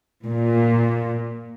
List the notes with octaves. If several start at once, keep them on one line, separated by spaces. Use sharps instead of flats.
A#2